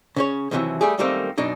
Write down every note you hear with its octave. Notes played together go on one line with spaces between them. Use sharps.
C#3 C#4 C#5
D#2 A2 C3 D#3 E3 F#3
G3 A3 G4 G#4
F#2 D#3 G3 A3 A#3 C4
F#2 B2 D4 D#4